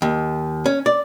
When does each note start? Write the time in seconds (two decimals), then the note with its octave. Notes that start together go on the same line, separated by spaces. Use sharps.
0.02 D#2
0.66 C#4
0.86 D5